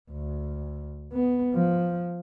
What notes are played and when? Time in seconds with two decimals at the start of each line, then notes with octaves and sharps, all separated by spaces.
0.11 D2
1.13 B3
1.55 F3